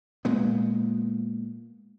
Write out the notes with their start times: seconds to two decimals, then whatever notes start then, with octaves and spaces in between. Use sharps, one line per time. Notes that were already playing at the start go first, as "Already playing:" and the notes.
0.25 A#2 G#3 B3